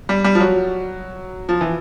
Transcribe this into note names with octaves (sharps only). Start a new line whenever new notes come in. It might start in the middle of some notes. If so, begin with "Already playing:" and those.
G3
G3
F3
F#3
F3
E3